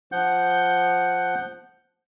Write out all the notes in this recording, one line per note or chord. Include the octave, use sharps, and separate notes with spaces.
F3 F#5 G6